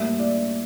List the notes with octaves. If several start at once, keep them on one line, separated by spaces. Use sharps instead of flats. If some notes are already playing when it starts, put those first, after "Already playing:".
Already playing: A2 G3 A#3 E5
D5